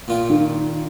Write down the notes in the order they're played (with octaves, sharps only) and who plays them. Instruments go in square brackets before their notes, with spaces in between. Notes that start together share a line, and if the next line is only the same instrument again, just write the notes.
[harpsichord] A#2 F4 G5
[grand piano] D#3